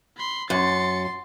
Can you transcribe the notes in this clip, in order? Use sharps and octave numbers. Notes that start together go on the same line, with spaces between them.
B5 C6
F#2 C6 A6 C#7